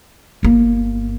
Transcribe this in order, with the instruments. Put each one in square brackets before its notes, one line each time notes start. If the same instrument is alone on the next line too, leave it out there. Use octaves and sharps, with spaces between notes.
[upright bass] G1 A#3